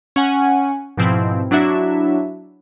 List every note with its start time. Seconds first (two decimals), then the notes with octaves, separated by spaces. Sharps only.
0.16 C#4 F#5 G#5
0.97 G#2 B2 F3 C4 E4
1.51 F#3 D4 E4 F#4 E5